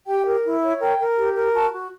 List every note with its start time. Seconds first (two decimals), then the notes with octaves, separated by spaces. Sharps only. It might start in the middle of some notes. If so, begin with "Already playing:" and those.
0.06 G4 G5
0.26 A#4
0.44 E4
0.62 C#5
0.81 A#4 G5
0.99 A#4
1.18 G4
1.36 A#4
1.54 F#4 A5
1.73 F#4